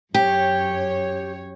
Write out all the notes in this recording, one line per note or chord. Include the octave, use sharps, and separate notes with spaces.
F#2 G4 C#5